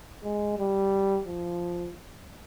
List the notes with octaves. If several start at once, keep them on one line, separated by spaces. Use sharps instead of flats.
G#3
G3
F3